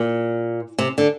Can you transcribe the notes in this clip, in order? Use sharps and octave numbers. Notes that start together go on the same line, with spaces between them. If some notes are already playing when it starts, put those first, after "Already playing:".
Already playing: A#2
C3
D3